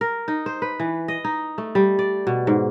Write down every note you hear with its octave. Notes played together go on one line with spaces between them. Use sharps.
A#4
D#4
C5
B4
E3
D#5
D#4
A3
G3
D5
B2
G#2